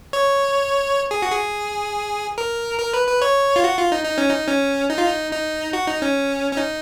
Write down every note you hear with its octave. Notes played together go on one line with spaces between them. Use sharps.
C#5
G#4
F#4
G#4
A#4
A#4
B4
B4
C#5
F4
F#4
F4
D#4
D#4
C#4
D#4
C#4
D#4
F4
D#4
D#4
F#4
D#4
C#4
C#4
D#4